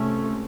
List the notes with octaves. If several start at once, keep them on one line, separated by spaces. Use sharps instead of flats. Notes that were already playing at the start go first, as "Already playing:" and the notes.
Already playing: C#2 C3 A3 C#4